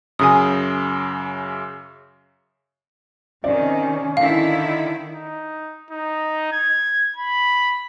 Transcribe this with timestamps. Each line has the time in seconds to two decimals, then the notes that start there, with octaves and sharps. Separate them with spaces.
0.19 F#2 C#3 G#5 D#6
3.44 C3 D#3 C#4 D5
4.17 D3 D#3 E4 F5
5.14 D#4
5.91 D#4
6.52 G#6
7.16 B5